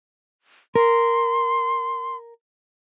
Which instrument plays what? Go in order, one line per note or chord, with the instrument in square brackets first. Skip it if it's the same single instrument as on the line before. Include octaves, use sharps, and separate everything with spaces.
[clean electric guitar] A#4 [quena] C6